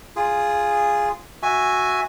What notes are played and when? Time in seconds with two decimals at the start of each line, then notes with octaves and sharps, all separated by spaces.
0.16 F4 G#4
1.43 F#4 E5 G#5